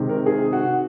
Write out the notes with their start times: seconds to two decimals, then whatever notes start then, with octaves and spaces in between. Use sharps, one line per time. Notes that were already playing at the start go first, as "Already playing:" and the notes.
Already playing: C3 D#3 G#3
0.09 A#4
0.26 G#4
0.53 F#4